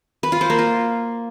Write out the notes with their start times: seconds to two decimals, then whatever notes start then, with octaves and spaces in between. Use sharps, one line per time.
0.23 B4
0.32 F4
0.41 C5
0.50 A#3
0.59 F4